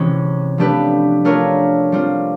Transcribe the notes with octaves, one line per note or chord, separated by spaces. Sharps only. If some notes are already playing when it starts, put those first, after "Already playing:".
Already playing: C3 E3 G#3 C#4
F3 A3 D4 G4 B4
A3 D4 F4 A#4 C#5
G3 C4 F4